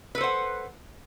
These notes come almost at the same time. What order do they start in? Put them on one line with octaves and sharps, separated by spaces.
B4 A4 C5 F#5